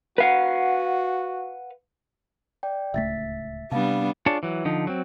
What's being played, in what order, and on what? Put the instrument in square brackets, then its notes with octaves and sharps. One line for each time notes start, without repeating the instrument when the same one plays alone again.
[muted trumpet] F#4 [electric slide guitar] B4 F5 F#5
[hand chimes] D5 G5
[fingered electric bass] D1 C#2 A3 [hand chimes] E5 A6 B6
[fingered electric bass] C3 [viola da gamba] G3 B3 D4 [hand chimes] F5 A5
[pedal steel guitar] D4 F4 G#4 C#5 A5
E3 F#3
D3 F3 D#4
F#3 C4